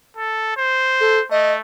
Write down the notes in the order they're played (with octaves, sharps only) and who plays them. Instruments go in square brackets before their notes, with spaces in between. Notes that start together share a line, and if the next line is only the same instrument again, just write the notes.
[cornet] A4
C5
[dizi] A4
[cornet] A3 [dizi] D#5